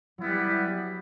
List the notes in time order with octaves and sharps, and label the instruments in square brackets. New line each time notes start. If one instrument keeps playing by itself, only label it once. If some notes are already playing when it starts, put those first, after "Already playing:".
[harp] F#3 [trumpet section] G3 B3 E4